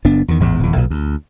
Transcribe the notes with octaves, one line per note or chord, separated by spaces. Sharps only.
F#1 B3 D4
E2 D#3
A1 E2 G#2
D1 E2
B1 A#2
D2